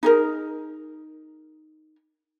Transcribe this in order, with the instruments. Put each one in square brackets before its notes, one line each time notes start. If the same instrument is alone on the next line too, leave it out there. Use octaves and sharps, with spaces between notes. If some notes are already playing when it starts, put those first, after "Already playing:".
[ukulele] D#4 G#4 A#4